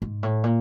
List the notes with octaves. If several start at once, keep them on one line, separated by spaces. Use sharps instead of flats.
G#2
A2
A#2